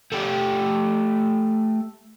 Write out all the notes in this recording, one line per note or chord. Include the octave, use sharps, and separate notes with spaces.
A3 G4